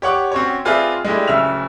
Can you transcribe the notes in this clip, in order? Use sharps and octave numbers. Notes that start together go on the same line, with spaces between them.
G4 C#5 F#5 D6
C4 C#4 F#4 C#5
C4 F4 G#4 B4 D5 E5
G#3 A3 D4 E4 G4
D1 C#3 E5 E6 F7